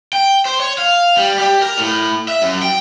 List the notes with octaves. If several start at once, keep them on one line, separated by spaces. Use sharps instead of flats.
G5
C5
C#5
F5
G3
G4
A#4
A2
E5
F#2
G5